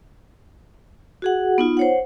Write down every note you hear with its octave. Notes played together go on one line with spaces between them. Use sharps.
F#4 G#4 F#5
B3 D#4 F4
C5 C#5 F#5